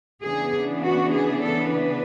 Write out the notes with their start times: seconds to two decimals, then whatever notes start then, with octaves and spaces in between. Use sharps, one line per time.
0.24 C#3 E3 B3 D4 G#4
0.83 F#4
1.12 G#4
1.43 A4
1.71 B4